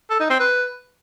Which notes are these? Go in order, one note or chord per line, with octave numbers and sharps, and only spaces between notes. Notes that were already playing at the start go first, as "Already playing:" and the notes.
A4
D#4
C4
B4